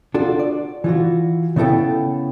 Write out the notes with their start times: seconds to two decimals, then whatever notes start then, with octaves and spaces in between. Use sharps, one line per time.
0.14 D4 F4 F#4 A4
0.39 D5
0.84 E3 F4 F#4
1.56 C#3 B3 E4 A4 G5